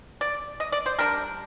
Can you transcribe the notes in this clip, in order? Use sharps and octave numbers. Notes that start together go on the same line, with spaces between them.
D5
D#5
D5
C5
G3 D4 A#4